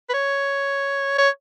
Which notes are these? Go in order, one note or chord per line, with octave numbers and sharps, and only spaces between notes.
B4
C#5
C#5